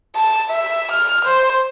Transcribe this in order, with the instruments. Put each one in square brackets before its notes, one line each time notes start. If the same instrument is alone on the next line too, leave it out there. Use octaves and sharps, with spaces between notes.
[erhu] A5
E5
F6
C5